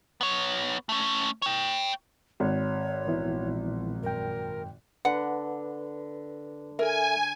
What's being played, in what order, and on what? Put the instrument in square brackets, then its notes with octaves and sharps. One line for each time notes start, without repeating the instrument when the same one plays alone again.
[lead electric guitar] B3 C#5
A3 C#4
C#5 G5
[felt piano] G#1 [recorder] C#5
[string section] A#1 [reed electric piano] E3 B3 E4
[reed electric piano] F#2 G5 [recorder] A#4
[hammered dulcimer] D3 [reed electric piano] B4 [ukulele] F#5
[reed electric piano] A4 E5 [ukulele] A#4 [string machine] G#5